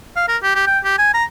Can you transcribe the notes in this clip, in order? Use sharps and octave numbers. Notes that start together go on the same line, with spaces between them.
F5
A#4
G4
G4
G5
G4
G#5
A#5